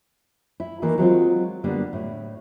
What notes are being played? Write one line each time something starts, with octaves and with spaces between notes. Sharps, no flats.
E4
D#3 E3 A#3 A#4
F#3 G#3 C4 F4
D3 G3 A#3 B3
A2